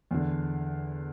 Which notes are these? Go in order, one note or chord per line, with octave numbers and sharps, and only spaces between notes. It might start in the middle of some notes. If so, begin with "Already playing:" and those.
E2 D3